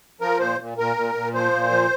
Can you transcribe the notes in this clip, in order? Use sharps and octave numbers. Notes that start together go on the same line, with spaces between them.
F3 A#4
A#2 C5
A#2
A#2 A#4
A#2
A#2
F3 C5
A#2
F3